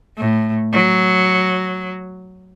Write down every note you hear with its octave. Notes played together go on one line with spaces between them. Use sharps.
A2
F#3